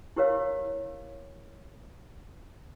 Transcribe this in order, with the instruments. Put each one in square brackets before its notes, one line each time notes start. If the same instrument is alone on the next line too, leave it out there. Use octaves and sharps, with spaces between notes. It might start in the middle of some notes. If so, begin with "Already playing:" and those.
[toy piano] E4 G4 A#4 C#5 F5